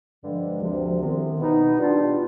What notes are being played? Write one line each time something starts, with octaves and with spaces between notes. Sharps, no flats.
G2 D3 F3 G#3
D2 C3 F3
C2 C3 D#3 B3
B2 B3 D#4
B2 G3 D4 F4